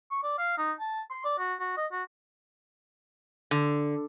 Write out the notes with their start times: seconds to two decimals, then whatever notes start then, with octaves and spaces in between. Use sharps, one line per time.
0.11 C#6
0.24 D5
0.38 F5
0.58 D#4
0.79 A5
1.10 C6
1.24 D5
1.38 F#4
1.60 F#4
1.77 D#5
1.92 F#4
3.51 D3